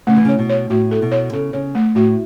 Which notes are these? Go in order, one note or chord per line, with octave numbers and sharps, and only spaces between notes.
C#3 A3
E3
C#3 C#5
B2
C#5
A2 F#4
A4
B2
C#5
C#3 A4
C#3 C#5
A3
A2 F#4